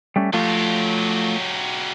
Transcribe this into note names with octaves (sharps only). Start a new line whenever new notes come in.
G3 A3 C#4
F3 F#3 A3 F4 G4